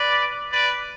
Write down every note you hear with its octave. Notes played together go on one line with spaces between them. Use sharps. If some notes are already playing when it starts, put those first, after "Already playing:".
Already playing: B4 D5
B4 D5